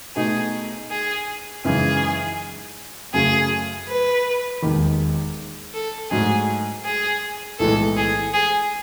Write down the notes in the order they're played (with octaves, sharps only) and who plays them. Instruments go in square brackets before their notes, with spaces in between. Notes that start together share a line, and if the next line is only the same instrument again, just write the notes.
[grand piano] B2 A3 D#4 [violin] G#4
[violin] G#4
[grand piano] F#2 C#3 E3 G#3 D#4 [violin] G#4
[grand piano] F#2 C#3 F#3 A3 [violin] G#4
[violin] B4
[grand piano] E1 D#2 D#3
[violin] A4
[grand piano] G#2 F#3 A3 [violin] G#4
[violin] G#4
[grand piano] B1 A2 E3 G#3 [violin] A4
[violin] G#4
G#4